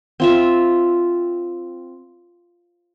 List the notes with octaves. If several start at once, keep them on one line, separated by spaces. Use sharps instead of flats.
C4 F4 E5